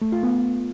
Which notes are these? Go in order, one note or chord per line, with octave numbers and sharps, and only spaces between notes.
A3
F4
B3